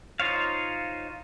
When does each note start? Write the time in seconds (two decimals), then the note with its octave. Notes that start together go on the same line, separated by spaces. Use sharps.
0.20 D#4 F4 C5 C#5 F5